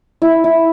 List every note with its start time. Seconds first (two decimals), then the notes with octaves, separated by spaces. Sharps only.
0.22 E4
0.44 E4